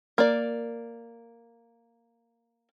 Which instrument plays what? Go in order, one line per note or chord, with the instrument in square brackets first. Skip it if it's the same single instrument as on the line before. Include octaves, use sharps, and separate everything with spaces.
[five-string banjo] A#3 D5